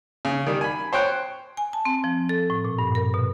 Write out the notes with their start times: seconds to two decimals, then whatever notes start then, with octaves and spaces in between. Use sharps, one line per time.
0.25 C#3
0.47 D#3 G3
0.61 G#5 B5
0.93 C5 C#5 G5 F#6
1.57 G#5
1.73 A5
1.85 C4
2.04 F3
2.29 A4
2.50 A2
2.65 A#2
2.79 G2
2.95 A#4
3.14 B2